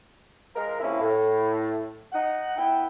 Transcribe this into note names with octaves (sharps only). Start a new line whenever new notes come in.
F3 G#3 A#4
C3 F3 A#3 C#4 E4
A2
D#4 F#5
B3 E4 G5